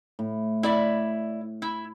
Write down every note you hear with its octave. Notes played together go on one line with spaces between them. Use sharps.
A2
E4 D5 E5
E4